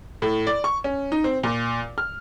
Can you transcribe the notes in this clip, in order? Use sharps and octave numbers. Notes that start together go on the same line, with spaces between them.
A2
D5
C#6
C#4
D#4
C4
A#2
F6